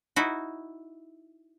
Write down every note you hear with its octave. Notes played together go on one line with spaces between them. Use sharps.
D#4 E4 F#4